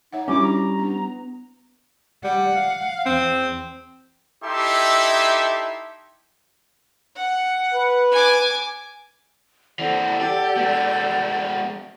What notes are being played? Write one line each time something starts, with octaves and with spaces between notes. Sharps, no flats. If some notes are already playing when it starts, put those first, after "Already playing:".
D#4 C#5 E5 F#5
G3 C#4 D4 E4 F#4 D6
D4 A#5
B3 D4
G3 F#5
F5
E2 C4
D#4 E4 G4 A4 E5 C6
F#5
B4
G#5 D6
E3 C4 A4 D5 F#5 G6
G4
G#3 B3